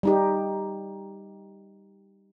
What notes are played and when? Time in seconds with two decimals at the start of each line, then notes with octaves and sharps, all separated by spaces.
0.03 G3 D#4 G4